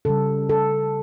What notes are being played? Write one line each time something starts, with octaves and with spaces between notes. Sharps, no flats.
C#3 G3 A4
A4